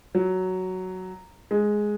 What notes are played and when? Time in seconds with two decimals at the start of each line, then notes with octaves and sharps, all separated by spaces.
0.15 F#3
1.51 G#3